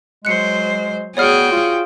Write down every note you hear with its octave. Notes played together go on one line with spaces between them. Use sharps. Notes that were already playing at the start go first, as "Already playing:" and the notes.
F#3 G#3 C5 F#6 C#7
B3 F#4 G#4 C#5 D5 G5 F6
F4